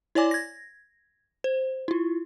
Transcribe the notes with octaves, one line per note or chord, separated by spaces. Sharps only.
E4 C#5 D5 G#5 D6
G#6 A#6
C5
E4 F4